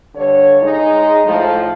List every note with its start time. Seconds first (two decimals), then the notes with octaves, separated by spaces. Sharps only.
0.15 G2 D3 C#5
0.62 G#3 D#4
1.26 A2 F3